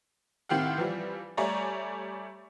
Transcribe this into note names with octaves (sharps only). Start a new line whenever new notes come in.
A2 D#3 C4 G4 F5 F#5
E3 F3 G3
G3 A3 C#5 D5 G#5 A#5